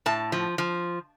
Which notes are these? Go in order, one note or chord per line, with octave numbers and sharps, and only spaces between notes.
A2 A5
F3
F3